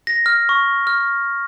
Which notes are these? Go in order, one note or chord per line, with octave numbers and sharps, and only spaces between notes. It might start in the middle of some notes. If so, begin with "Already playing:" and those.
A#6
F6
C#6
F6